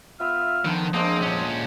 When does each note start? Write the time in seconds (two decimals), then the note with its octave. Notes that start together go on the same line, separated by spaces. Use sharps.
0.20 B3 F4 E5 F6
0.65 D3 D#3 F3 B3
0.94 E2 G#3 A#3 C4 D4 C5 D#6
1.22 A#2 C#4 F#5